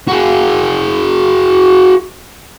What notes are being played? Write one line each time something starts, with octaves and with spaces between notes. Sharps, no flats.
F#4 G#4